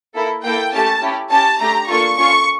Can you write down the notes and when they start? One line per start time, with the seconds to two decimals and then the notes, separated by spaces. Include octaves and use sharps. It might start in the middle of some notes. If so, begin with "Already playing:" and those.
0.16 A#3 E4 A4
0.44 A#3 E4 A4 G5
0.73 A3 C#4 G4 A5
1.02 C#4 E4 G4
1.31 C#4 G4 A5
1.60 A3 D4 G4 A#5
1.89 A#3 D4 F4 A4 C#6
2.17 C#4 F4 A4 C#6